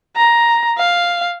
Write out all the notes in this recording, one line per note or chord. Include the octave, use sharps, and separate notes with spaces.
A#5
F5